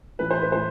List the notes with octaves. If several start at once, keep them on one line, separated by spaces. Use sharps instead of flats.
A2 E3 B4
C5
B4
A2 C5